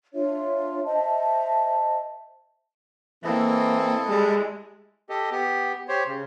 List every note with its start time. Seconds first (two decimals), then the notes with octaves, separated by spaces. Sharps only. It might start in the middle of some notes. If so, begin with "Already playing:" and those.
0.14 D4 F4 C#5 E5
0.85 C5 D#5 E5 A5
3.24 E3 A#3 C4 E4 A4 D#5
4.09 G3 G#3 G#4
5.09 G4 A4 D#5
5.31 B3 G4
5.88 G4 C5 C#5
6.06 C#3